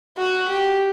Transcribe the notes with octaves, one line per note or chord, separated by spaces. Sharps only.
F#4
G4